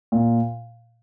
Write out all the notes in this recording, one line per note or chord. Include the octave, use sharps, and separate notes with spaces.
A#2